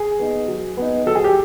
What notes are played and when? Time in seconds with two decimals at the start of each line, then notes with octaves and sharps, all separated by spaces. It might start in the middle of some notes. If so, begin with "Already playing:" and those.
Already playing: G#4
0.19 B3 D#4
0.48 F#3
0.77 B3 D#4
1.06 F#3 A4
1.15 G#4
1.24 G4